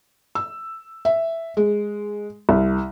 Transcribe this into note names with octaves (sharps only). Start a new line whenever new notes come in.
E6
E5
G#3
C2